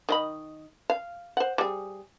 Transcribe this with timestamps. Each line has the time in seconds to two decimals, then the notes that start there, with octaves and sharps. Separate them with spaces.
0.09 D#3 D#5 B5
0.90 F5
1.37 C5 F#5
1.58 G3 G#4